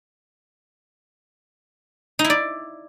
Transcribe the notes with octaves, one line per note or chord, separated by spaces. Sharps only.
D#4
E4
D5